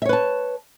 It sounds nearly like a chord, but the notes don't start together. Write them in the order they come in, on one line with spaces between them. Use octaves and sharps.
E5 C#5 B4 A5